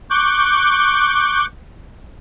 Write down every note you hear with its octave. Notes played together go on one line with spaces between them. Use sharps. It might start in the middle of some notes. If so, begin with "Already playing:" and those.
C#6 D6 F#6 G6